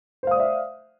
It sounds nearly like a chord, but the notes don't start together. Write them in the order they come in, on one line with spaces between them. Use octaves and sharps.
C5 F5 D#6 D5 E5